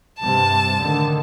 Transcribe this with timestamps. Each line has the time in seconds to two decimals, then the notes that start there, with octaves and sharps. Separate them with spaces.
0.19 G2 C3 A5
0.79 A2 D3 D#3